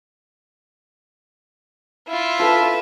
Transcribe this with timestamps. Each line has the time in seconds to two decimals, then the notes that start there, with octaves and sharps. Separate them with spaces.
2.07 E4 F4
2.39 F3 A4 B4 E5